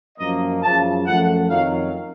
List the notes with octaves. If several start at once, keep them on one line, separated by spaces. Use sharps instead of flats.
F#2 F3 A#3 D#5
F#2 C#3 F3 A5
F#2 F3 A3 F#5
F2 D#3 F#3 F5